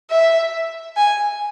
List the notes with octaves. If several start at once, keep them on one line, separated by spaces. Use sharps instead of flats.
E5
G#5